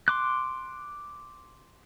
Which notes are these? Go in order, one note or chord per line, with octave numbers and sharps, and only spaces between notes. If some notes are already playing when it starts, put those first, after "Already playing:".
C6 D6 F#6